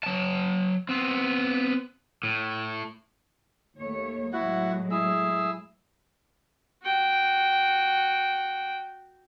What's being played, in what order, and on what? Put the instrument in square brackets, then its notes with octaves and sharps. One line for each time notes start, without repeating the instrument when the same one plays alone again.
[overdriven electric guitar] F#3 A5
B3 C4
A2
[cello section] D#2 A3 C#5
[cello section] A2 F#3 G#3 [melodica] E4 F#4 F#5
[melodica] E4 G#4 E6
[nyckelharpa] F#4 G5